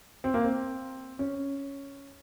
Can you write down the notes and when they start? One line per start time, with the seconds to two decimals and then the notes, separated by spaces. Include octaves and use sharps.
0.24 C4
0.34 A#3
0.44 C4
1.19 C#4